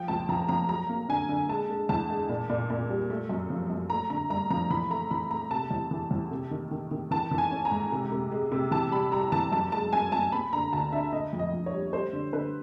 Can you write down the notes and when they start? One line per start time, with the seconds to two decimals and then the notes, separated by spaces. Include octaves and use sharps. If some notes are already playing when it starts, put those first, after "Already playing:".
Already playing: F3 G5
0.08 C#2 A5
0.29 F3 A#5
0.49 F3 A#5
0.69 F#3 A#5
0.89 A#3
1.09 D3 G#5
1.29 D3
1.49 G#3 A5
1.70 G#3
1.89 E2 A5
2.10 G#3
2.29 A#2
2.49 A#2
2.70 A#2
2.90 G3
3.10 A3
3.29 F#2
3.50 F3
3.70 F#2
3.90 A3 A#5
4.10 D3 A#5
4.30 G2 A#5
4.50 F3 A#5
4.70 E3 B5
4.90 A3 A#5
5.11 E3 B5
5.31 A3 A#5
5.51 C3 A5
5.71 E2
5.91 E3
6.11 E2
6.31 C3
6.51 D#3
6.71 D#3
6.91 D#3
7.11 E3 A5
7.31 E3
7.38 G#5
7.51 C#4
7.65 A#5
7.71 G#2
7.92 C3
8.12 C3
8.32 G#3
8.52 C3
8.71 E3 A5
8.91 G3 B5
9.12 G3 A#5
9.32 E3 A5
9.52 F#2 A5
9.72 G#3 A5
9.93 F#2 G#5
10.12 F#2 A5
10.32 B3 B5
10.52 D3 A#5
10.73 D2 A5
10.92 D3 E5
11.12 D3 D#5
11.33 F2
11.39 D#5
11.53 F2
11.66 C#5
11.73 G3
11.93 G3 C5
12.13 D3
12.33 D3 B4